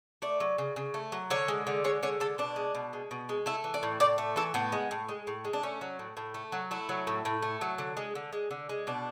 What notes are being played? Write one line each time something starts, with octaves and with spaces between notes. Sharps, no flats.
A3 D5
F#3
C#3
C#3
A3
F#3
D3 C#5
G#3
D3
G#3 C#5
D3 C#5
G#3 A4
B2 D4
G#3
B2
G#3
B2
G#3
A3 E4
E3
D5
A2
A2 D5
A3
E3 A4
A2 B3
G#3
A2
G#3
A2
G#3
D4
A3 C#4
F#3
A2
A2
A3
F#3
A3 E4
F#3
A2
A2
A3
F#3
D3
G#3
D3
G#3
D3
G#3
B2 D4